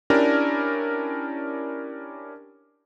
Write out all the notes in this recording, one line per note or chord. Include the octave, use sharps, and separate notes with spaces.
C#4 D4 E4 G4 A#4 D5